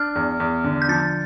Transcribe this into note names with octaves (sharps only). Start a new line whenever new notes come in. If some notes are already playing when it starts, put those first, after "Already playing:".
Already playing: D4 F6
E2
E2
D3
G6
F3 A6